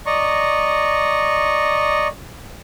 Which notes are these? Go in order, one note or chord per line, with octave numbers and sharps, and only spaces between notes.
D5 D#5 A#5 C#6